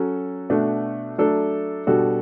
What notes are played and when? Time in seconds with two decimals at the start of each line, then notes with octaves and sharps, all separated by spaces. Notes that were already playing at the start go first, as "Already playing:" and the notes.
Already playing: F#3 C#4 F#4 A4
0.50 B2 A3 D4 F#4
1.18 F#3 A3 D4 A4
1.87 B2 G3 D4 F#4 A4